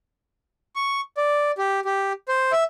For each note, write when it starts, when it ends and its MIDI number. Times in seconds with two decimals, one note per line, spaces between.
0.76 1.01 85
1.17 1.51 74
1.58 1.80 67
1.85 2.13 67
2.28 2.52 72
2.52 2.64 76